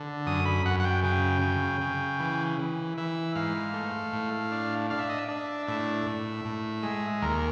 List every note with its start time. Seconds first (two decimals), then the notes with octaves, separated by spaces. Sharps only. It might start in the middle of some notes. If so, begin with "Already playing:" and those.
Already playing: D3
0.26 F#2 D#6
0.45 B5
0.65 F#2 F#5
0.80 F#5
0.85 G5
1.03 C#3 G5
1.42 C#3
1.81 C#3
2.20 E3
2.59 E3
2.98 E3 E5
3.35 G#2 F5
3.74 A3
4.13 A2
4.51 D4
4.90 D4 F5
4.99 E5
5.09 D#5
5.18 E5
5.28 D4
5.67 A2 E5
6.06 A2
6.45 A2
6.83 G#3
7.22 D#2 A#4